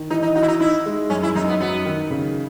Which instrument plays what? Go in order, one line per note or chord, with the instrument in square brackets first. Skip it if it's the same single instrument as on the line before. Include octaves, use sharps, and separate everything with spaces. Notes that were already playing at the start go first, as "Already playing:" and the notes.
Already playing: [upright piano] D#3
[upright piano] E3 [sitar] D#4
[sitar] D#4
[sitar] D#4 [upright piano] F#4
[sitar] E4
D#4
[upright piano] D#4 [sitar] E4
[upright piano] G#3
[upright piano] F#2 [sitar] C#4
[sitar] E4
[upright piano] F#2 [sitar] D#4
[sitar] B3
[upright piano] F#3 [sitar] B3
[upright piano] D#3
C#3